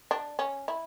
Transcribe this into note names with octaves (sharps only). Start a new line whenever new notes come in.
D4
C#4
E4